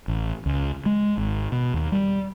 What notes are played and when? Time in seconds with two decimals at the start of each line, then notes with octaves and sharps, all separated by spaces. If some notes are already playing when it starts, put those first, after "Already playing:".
0.08 A1
0.46 C#2
0.86 G#3
1.18 G#1
1.52 B2
1.74 D#2
1.92 G3